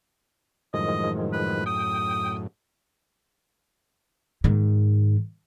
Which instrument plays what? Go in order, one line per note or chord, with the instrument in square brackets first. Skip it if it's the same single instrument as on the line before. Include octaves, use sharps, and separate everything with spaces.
[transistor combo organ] F#2 A2 [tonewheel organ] D#3 F3 G#3 [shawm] D#5
[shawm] B4
[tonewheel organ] G5 [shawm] D#6
[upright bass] G#2 D#3